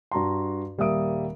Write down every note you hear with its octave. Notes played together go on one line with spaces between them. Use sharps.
G2 F#4 A5 A#5 C6
D#1 G3 A#3 E5 D#6 D7